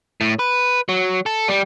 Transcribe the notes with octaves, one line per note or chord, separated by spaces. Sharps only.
A2
B4
F#3
A4
G3